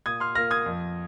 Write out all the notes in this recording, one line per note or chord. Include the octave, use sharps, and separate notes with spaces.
A#2 D#6 G#6
C6 F6
A#3 F4 F6 A#6
D#6 G#6
F2